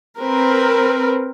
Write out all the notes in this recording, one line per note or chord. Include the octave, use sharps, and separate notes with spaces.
C4 A#4 B4